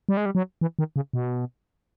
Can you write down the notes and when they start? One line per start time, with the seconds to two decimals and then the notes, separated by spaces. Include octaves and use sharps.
0.09 G3
0.17 G#3
0.26 G3
0.35 F#3
0.61 E3
0.79 D#3
0.96 C#3
1.13 B2